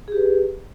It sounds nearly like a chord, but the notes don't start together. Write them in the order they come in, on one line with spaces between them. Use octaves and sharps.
G#4 G4 B4